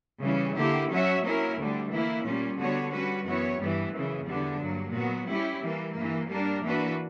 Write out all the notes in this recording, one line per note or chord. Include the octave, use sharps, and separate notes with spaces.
C#3 E3 G3 C#4
D3 A#3 E4 G4
F#3 C#4 F#4 C#5 E5
F#3 A#3 C#4 E4 A#4
D2 D3 G3
E3 A#3 E4
A#2 G3 C#4
D3 G3 B3 F#4 C#5
G3 C#4 F#4 B4
F#2 E3 B3 F#4 C#5
G2 E3 G3 B3
F#2 C#3 E3
E2 D3 G3 B3 D4
G2 F#3 A#3
A#2 F#3 B3 F#4
G3 C#4 E4 G4
E3 G3 A#3
G2 E3 A#3
G3 A#3 D4 A#4
E3 A#3 D4 F#4 B4